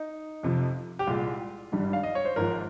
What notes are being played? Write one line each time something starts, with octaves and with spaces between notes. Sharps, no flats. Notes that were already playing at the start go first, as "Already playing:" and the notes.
Already playing: D#4
F2 C3 F3
G4
C2 A#2 G#3 F4
G#1 G2 G3
F5
D#5
C#5
C5
G#1 G#2 F3 A#4